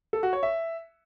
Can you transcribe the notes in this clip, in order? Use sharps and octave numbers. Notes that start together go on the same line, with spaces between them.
A4
F#4
C#5
E5